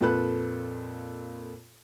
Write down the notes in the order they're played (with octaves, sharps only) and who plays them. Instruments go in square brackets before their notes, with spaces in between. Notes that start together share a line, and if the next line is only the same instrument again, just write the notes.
[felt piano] F2 A#2 F4 A4 B4 F#6